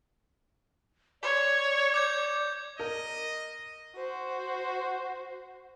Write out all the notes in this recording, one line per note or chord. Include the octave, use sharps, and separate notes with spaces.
C#5 D5
D6 G6 G#6
A#4 D#5
F#4 C5